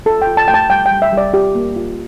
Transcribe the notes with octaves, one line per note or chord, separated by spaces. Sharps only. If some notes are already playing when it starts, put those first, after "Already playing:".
F4 A4
G5
F4
A5
A3 G5
A5
G3 G5
G5
G3
E5
G3
D5
F4 G4
A#3
F4